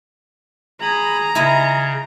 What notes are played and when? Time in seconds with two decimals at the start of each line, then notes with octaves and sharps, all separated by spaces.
0.82 G#4 A#5 B5
1.35 C#3 E4 D#5 E5 G#5